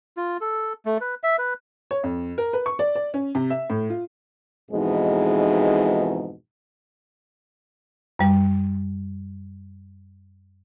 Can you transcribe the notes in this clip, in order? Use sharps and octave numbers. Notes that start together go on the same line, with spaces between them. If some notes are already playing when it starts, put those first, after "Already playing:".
F4
A4
A3
B4
E5
B4
C#5
F2
A#4
B4
C#6
D5
D5
C#4
C3
E5
A2
F4
F2 G#2 B2 E3 G#3 D#4
F#2 G3